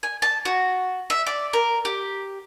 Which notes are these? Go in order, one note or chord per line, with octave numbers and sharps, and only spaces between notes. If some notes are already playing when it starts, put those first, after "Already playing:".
G#5
A5
F#4
E5
D5
A#4
G4